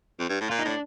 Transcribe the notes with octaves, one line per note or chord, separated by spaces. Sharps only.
F2
G2
A2
A#2 F4
D#4
A2 D4